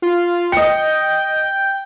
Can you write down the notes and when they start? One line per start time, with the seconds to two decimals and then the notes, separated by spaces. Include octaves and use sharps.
0.02 F4
0.52 D#5 G5 C#7